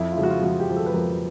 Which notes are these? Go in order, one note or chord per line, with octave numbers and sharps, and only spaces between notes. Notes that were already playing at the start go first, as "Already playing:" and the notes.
Already playing: F2 E4
F4
C#3 F3 E4
F#4
F4
F2 F#4
G4
C#3 F3
A4
B4
F2 A#4